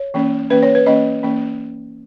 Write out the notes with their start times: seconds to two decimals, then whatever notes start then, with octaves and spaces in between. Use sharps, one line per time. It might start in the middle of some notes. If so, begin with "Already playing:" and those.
Already playing: C#5
0.14 E3 A#3 C#4
0.50 E3 A#3 C#4 B4
0.63 C#5
0.75 B4
0.86 E3 A#3 C#4 D#5
1.23 E3 A#3 C#4